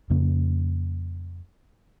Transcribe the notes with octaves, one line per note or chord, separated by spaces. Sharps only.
F2 C#3 A#3